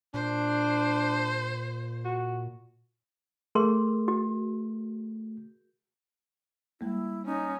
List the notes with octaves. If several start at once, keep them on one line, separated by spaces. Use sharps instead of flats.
A#2 D4 C5
F#4
A3 G#4 A#4 C6
F#4
G3 G#3 A#3 E4
C#4 D#4